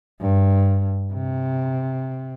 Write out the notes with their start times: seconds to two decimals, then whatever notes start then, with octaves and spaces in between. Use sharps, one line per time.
0.21 G2
1.14 C3